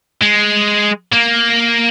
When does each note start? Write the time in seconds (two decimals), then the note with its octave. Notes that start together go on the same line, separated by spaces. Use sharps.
0.22 G#3
1.13 A#3